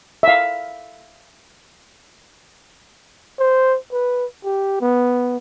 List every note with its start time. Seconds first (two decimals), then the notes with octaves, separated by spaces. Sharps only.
0.23 E5 F5
3.39 C5
3.92 B4
4.44 G4
4.81 B3